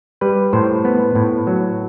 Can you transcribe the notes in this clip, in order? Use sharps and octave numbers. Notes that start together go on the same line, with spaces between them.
G3 B4
A2 C5
B3
A2
F#3